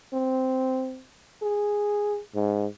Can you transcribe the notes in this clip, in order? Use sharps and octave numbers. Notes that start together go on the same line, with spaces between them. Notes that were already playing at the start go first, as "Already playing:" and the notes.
C4
G#4
G#2